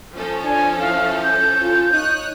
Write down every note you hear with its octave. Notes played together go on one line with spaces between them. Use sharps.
F3 C#4 A4
D4 G#5
E4 F5
G6
F4
D#4 C#5 D#6 F#6